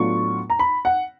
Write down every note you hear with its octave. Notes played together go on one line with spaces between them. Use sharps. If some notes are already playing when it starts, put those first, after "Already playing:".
Already playing: A2 F#3 B3 D4 F4 C#6
A#5
B5
F#5